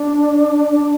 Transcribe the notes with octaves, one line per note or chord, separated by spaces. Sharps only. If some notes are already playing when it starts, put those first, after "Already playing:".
Already playing: D4
D4